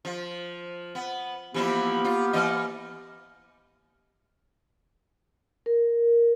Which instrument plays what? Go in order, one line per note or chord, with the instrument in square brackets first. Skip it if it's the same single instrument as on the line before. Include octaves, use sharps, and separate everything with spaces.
[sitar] F3
B3
[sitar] E3 F3 E4 [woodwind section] A#3 B3 G4
[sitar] F4
E3 D#5
[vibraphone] A#4